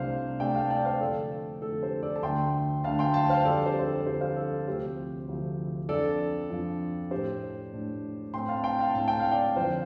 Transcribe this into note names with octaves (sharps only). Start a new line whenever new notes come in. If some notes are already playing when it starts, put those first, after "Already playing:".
Already playing: C2 C3 A3 D4 C5 F5
C2 C3 A3 D4 D5 G5
F5 A5
D5 G5
C5 F5
F2 D3 A3 A4 D5
F2 D3 A3 A4
G4 C5
A4 D5
A5
D2 D3 A3 D4 G5 C6
D2 D3 A3 D4 F5 A5
G5 C6
F5 A5
C5 F5
F2 D3 G3 A4 D5
G4 C5
C5
A4
F2 D3 G3 G4 C5
C5 F5
A4
D2 C3 F3 A3 C4 G4 C5
D2 C3 F3 A3 C4
F2 F3 D4 A4 D5
F2 F3 D4
A2 A3 D4 G4 C5
A2 A3 D4
A2 A3 C4 G5 C6
F5 A5
G5 C6
F5 A5
A2 A3 C4 A5
G5
F5
D5 G5
F2 D3 F3 D4 C5 F5